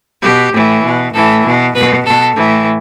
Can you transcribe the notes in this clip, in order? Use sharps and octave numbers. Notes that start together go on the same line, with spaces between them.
B2 G4
A2 E3
B2
A2 E3 A4
B2
B2 B4
B2 A4
A2 E3